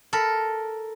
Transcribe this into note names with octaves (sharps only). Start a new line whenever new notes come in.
A4 A#4 B5